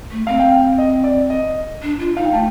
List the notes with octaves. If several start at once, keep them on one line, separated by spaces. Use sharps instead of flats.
A3
C4 F5
G5
F5
D#5
D5
D#5
D4
F4
D#4 F5
G5
A3 A5